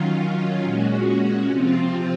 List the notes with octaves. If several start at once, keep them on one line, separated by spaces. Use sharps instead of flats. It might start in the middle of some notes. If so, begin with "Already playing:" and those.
Already playing: D#3 F#3 C#4 F4
A#2 G#3 C#4 F#4
C3 F3 C4 F4